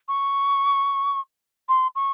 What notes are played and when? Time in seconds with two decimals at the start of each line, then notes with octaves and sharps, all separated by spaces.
0.08 C#6
1.68 C6
1.95 C#6